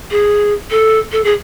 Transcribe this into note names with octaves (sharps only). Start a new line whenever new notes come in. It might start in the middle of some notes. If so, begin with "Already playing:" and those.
G#4
A4
A4
G#4